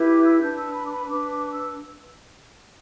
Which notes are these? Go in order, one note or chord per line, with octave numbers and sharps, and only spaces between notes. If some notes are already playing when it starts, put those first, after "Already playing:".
Already playing: E4 G4 B4
D6
E6
D4 B4 G6
E6
B5
D6
B5
D4 B4 D6
D6
D6
E6